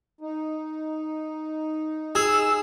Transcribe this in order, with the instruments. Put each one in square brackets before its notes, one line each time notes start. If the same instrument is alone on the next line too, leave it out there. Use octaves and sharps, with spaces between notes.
[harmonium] D#4
[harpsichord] G#4 [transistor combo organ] E6